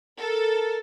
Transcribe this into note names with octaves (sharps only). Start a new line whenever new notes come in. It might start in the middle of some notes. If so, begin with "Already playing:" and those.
A4 A#4